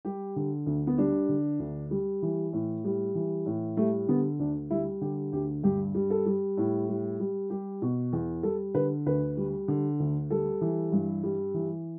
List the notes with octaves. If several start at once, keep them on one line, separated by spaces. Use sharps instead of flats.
G3 G4
D3
D2
B3
G3 D4
D3
D2
G3
E3
A2
G3
E3
A2
G3 A3
D3 B3
D2 D4
G3 E4
D3 G4
D2 G4
G2 G4
G3
A4
G3
A2
G3
G3
G3 G4
B2
E2
G3 A4
D3 B4
D2 B4
G3
D3
D2
G3 A4
E3
G2
G3
E3